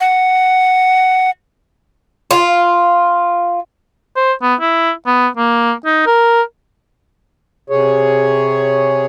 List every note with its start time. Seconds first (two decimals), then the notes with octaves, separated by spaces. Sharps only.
0.01 F#5
2.31 F4
4.16 C5
4.42 B3
4.60 E4
5.06 B3
5.37 A#3
5.85 D#4
6.06 A#4
7.70 C3 G#4 C#5